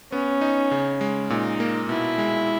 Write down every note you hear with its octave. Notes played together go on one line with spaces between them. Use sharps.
B3 C#4
D#4
C#3
G#3
A#2 D#4
A#3
B2 E4
G#3